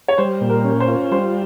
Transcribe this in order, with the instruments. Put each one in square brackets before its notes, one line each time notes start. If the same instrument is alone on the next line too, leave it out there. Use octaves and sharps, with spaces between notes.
[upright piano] C#5
[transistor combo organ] G3 [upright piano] C5
[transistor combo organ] A#2
[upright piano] A#4
[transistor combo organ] C#4
[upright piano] C5
[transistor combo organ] F4
[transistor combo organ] G3 [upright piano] C5